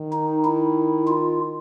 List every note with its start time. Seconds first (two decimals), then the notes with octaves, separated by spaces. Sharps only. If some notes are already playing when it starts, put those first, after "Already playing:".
Already playing: D#3
0.13 D#4
0.45 E4
1.08 F4